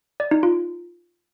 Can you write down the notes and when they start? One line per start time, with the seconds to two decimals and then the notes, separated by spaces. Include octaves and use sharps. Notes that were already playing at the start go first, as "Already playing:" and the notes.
0.20 D5
0.31 D#4
0.43 F4